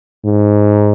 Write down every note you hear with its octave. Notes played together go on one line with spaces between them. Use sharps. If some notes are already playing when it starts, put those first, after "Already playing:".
G#2